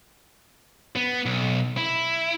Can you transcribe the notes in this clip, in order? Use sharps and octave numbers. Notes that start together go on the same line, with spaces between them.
B3
B1
E4